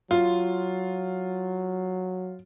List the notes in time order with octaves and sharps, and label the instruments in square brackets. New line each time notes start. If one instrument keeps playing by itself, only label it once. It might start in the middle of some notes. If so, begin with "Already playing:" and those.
[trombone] F#3 [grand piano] F4